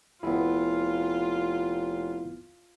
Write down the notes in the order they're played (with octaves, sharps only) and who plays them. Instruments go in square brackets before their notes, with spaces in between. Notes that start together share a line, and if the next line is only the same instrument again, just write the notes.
[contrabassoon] F1 [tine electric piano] B3 E4 [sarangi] F4